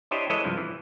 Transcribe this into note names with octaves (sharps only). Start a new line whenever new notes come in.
D4 E4 G4 C5 C#5 D#5
E3 G#3 E4 A4 C#5 D#5
G2 C3 F3
E3